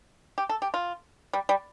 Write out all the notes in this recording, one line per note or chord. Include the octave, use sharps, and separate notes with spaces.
G4
A4
G4
F4
G3
G3